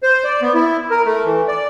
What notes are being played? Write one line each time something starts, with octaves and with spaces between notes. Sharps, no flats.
C5
D5
B3
E4
A#4
A3
E3
D5